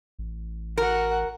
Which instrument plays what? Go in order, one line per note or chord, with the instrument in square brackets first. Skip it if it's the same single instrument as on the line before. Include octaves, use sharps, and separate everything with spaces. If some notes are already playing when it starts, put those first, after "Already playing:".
[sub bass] A1
[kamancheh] F#4 F#5 [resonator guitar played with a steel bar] A#4